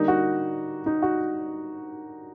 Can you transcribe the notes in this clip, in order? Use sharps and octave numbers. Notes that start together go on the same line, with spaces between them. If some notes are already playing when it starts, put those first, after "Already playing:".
Already playing: D3 G3 A#3 D#4
F#4
D#4
F#4